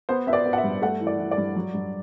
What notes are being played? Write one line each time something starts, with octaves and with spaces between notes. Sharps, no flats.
B3 C5
B3 E5
D5
B3
F#5
E5
G2
A3 F#5
E3
D5
E3
D5
G2
F#3
G2